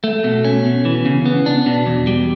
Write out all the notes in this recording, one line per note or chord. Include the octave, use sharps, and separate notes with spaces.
A3
B2
C#4
B2
E3
C#3
B3
D4
B2
E2
G3